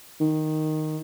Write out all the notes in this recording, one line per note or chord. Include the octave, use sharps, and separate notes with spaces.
D#3